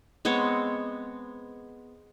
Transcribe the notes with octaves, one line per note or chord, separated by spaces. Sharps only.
G#3 B3 C4 C#5